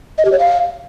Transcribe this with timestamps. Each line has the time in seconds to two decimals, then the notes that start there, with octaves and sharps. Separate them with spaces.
0.18 D#5
0.25 G4
0.32 C#5
0.39 F5